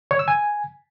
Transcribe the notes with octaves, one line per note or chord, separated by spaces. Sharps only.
C#5
E6
G#5